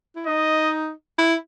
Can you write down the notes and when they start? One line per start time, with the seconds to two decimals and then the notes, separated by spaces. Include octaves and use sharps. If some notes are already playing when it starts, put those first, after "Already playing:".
0.16 E4
0.27 D#4 D#5
1.18 E4